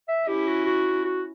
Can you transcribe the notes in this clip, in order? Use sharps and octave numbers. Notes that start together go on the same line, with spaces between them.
E5
C#4 E4 G4
F#4
F#4
F#4